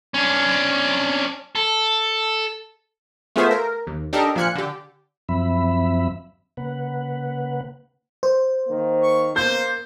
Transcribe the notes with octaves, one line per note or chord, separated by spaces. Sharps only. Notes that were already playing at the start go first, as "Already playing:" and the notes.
C#4 D4
A4
A3 B3 F4 G#4 C5 E5
A#4
D#2
D4 D#4 G4 A4 A#4 D#5
A#2 F3 F5 G#5 F#6 C#7
D3 G4
F#2 F3 C4 E5 B5
C#3 A#3 B4 F#5
C5
D#3 A#3
C#6
A#3 C5 G6